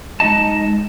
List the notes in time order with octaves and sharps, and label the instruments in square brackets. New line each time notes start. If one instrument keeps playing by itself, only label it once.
[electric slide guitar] G#3 D#4 E4 D#5 A5